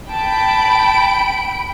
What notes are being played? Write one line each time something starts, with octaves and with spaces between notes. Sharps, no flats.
G5 A5 B5 D7